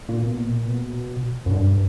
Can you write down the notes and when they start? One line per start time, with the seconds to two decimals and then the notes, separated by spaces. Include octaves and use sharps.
0.09 A#2
0.23 B2
0.37 A#2
0.66 B2
1.46 F#2
1.51 G2